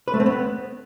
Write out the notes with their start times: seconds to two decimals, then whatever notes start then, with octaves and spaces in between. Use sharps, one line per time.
0.08 B4
0.14 A3
0.20 C4
0.26 B3